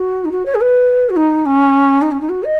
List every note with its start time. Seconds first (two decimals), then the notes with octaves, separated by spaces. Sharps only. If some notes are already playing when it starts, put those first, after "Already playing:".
Already playing: F#4
0.25 D#4
0.31 F#4
0.45 C#5
0.54 G#4
0.61 B4
1.09 F#4
1.16 D#4
1.45 C#4
2.01 D#4
2.11 C#4
2.20 D#4
2.29 F#4
2.43 D#5